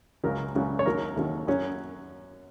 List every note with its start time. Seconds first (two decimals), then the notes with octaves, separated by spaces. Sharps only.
0.24 C#2 C#3 F#3 A#4
0.55 C#2 C#3 F#3
0.79 C#5
0.85 D#2 D#3 F#3 A#4
1.16 D#2 D#3 F#3
1.47 F#2 F#3 C#4